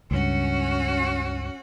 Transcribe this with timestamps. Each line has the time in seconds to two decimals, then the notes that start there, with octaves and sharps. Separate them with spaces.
0.11 C#2 G2 C#4 F#4